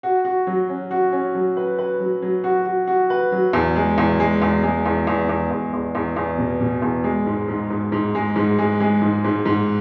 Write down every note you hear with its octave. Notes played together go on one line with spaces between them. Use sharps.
F#4
F#4
F#3
C#4
F#4
C#4
F#3
B4
B4
F#3
F#3
F#4
F#4
F#4
B4
F#3
E2
G#3
E2
G#3
E2
G#3
E2
E2
E2
E2
E2
E2
E2
B2
B2
E2
G#3
G#2
G#2
G#2
G#2
G#3
G#2
G#3
G#3
G#2
G#2
G#2